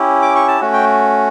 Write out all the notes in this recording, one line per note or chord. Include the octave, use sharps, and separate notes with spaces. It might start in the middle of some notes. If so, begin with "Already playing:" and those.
Already playing: C#4 E4 G4
D6
C#6
A5
A3 C#4 F#4
G5